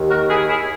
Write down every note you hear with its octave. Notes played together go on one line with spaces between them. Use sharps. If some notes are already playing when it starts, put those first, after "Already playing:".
Already playing: D#2 D#3
F#4 A#4
E4 G#4
E4 G#4